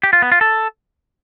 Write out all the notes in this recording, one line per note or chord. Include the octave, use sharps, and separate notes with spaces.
G4
F4
B3
F4
A4